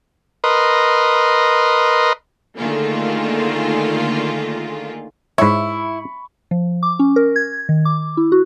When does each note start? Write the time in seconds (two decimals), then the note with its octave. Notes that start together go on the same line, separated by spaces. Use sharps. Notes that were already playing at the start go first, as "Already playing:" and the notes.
0.44 A#4 B4 D#5 C6
2.58 D3 D#3 A3 A#3 F4 G#4
5.38 G#2 E4 C#5 B5 C#6
6.51 F3
6.83 D6
6.99 C#4
7.16 A#4
7.36 G#6
7.69 D#3
7.85 D6
8.17 E4
8.32 F#4